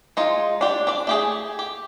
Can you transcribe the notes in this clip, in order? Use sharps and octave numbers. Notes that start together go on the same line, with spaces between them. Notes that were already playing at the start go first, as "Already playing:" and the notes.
G#3 D#4 F4
D4 G4
D4 D5
A3 G4 G#4
G4